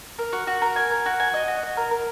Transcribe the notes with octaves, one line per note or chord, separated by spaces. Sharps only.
A#4
F#4
F#4
A#4
G#5
A#4
F#4
G#5
D#5
F#4
D#5
A#4
A#4